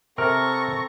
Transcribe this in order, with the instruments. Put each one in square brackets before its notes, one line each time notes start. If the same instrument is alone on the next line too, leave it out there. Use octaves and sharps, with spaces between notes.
[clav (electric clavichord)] C3 A#4 [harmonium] C4 A4 A#5 [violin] C#6 A#6